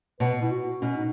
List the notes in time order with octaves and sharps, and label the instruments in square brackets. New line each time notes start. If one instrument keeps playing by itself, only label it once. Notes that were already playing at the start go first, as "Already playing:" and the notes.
[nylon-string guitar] B2 [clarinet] B4
[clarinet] E4
F#4
[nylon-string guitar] B2 [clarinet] C#4
[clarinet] D#4